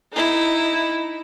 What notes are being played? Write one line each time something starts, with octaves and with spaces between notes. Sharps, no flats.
D#4 E4